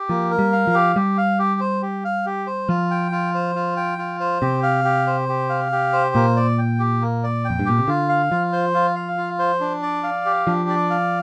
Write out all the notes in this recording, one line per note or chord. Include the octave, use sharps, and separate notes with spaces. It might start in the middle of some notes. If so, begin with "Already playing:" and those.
Already playing: G4
F3 A#3
A#4
G3
F5
F3
G4
G3 G4
F5
G4
C5
G4
F5
G4
C5
F3 F4
G5
F4
C5
F4
G5
F4
C5
C3 G4
F5
G4
C5
G4
F5
G4
C5
A#2 A#3
D5
G5
G4
A#3
D5
G5
F2
G2
A#2 G4
C3
D3 F4
F5
F3 F4
C5
F4
F5
F4
C5
D4
D5
F5
G4
F3 D4
D5
F5